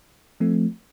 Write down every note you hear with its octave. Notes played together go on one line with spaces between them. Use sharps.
F3 A3 C4